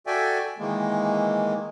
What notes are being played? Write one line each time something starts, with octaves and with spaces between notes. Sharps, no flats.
F#4 A4 D5 E5 G5 G#5
D#3 E3 G#3 A#3